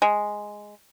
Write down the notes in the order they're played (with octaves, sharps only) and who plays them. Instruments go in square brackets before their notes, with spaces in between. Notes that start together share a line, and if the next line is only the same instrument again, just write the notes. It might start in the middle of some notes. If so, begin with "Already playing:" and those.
[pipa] G#3